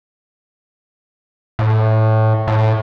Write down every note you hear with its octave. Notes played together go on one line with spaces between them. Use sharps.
A2
A2